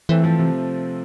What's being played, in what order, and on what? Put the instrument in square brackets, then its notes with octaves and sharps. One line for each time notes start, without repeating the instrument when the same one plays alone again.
[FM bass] E3 [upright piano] A3 C4
[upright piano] F3 A3
C3